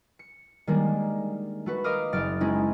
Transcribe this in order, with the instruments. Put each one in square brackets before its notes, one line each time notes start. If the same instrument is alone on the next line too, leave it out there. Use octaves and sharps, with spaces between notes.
[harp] C#7
D#3 G3 G#3 A#3 D4
A3 F#4 B4
A#4 D#5 F5 D6 D#6 F6
F#1 F6 A6 D7
G#3 C4 C#4 D#4 E4